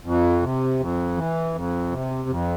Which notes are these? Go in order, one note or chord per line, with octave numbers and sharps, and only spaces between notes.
F2
C3
F2
E3
F2
C3
F2